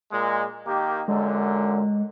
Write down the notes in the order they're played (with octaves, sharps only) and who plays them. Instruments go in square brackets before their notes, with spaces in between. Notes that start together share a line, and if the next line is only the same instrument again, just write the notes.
[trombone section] A#2 G#3
D#3 A#3 G4
[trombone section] F#2 A#2 D3 [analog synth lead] G#3